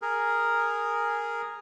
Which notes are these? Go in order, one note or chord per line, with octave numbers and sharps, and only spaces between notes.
G#4 A#4